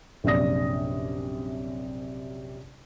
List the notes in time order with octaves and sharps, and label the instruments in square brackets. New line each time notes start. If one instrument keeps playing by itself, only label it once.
[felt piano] A#1 F#2 C3 D5 D#6 A#6